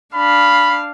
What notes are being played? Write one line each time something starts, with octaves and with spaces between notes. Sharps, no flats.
D4 F5 B5